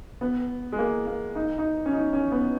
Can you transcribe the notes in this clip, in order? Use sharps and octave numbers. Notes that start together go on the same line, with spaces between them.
B3
G#3
A#3
A#3
D#4
D#4
C#4
D#4
C#4
B3